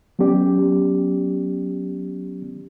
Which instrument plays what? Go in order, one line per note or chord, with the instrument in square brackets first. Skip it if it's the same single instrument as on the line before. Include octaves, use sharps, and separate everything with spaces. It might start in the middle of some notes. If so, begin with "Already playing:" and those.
[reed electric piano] F#3 B3 C#4 G4 D5